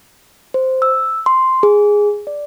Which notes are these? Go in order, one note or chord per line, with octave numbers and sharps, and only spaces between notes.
C5
E6
C6
G#4
D5